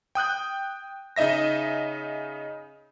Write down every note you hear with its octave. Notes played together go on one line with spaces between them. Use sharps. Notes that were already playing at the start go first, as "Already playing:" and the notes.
G5 D#6 F#6 G6
C#3 D#4 D#5 E5 A#6